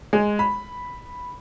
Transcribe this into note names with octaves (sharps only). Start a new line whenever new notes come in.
G#3
B5